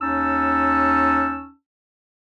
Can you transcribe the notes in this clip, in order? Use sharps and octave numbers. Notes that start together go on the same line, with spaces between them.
D#2 C#4 D#4 A5 E6